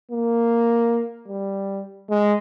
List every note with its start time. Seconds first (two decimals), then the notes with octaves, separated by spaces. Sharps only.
0.11 A#3
1.28 G3
2.10 G#3